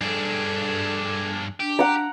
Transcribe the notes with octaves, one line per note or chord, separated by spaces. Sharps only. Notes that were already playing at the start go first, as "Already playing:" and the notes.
G2 D4 G#4 A4
D4 G4
F#5 A#5